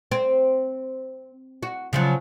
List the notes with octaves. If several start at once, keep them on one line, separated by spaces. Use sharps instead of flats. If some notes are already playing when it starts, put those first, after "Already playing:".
C4
F#4
C#3 F3 F#3